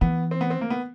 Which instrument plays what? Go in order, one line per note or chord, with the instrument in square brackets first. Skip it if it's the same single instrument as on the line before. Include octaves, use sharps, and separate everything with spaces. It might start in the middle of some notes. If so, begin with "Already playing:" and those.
[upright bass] E3 [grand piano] B3
[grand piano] C4
B3
C4
A#3
B3